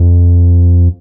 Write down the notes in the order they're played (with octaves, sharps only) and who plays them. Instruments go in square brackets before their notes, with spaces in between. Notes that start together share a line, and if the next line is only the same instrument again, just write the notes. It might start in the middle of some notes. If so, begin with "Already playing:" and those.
Already playing: [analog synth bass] F2